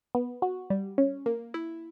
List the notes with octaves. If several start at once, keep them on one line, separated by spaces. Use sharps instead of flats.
B3
F#4
G3
C#4
A#3
E4